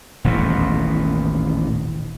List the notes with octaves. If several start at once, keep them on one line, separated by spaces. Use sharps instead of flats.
D#1 A1 E2 B2